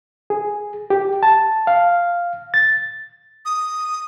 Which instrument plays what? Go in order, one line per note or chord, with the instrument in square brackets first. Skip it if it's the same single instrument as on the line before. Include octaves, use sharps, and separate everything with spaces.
[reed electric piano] G#4
G4
A5
F5
A6
[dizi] D#6